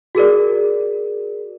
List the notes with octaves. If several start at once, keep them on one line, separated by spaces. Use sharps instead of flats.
F#4 G#4 A#4 D5